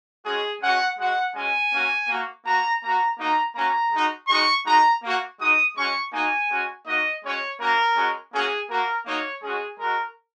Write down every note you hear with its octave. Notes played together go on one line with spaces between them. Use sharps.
G#3 C#4 F#4 G#4
G#3 C#4 F#4 F#5
G#3 F#4 F#5
G#3 C#4 F#4 G#5
A#3 C#4 F#4
A#3 F#4
A#3 F#4 A#5
A#3 F#4 A#5
A#3 D#4 F#4 A#5
A#3 C#4 F#4 A#5
G#3 D#4 F#4
G#3 D#4 F#4 C#6
G#3 D#4 F#4 A#5
A#3 F#4
G#3 D#4 F#4 D#6
G#3 C#4 F#4 C#6
A#3 D#4 F#4 G#5
G#3 C#4 F#4
A#3 D#4 F#4 D#5
G#3 C#4 F#4 C#5
A#3 C#4 F#4 A#4
G#3 C#4 F#4
A#3 C#4 F#4 G#4
A#3 F#4 A#4
A#3 D#4 F#4 C#5
G#3 C#4 F#4 G#4
G#3 F#4 A#4